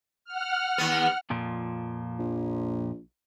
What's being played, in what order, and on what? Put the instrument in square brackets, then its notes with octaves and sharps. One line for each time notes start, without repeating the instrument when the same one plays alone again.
[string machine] F#5 F6
[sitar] D#2 B3
[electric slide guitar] F2 A#2 F3
[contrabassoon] A#1